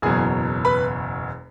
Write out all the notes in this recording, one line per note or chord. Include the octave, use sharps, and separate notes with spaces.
F#1 E2 B2 F#3 G#4 G#5
B4 B5